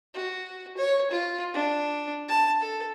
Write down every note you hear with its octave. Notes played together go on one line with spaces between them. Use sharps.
F#4
C#5
F4
D4
A5
A4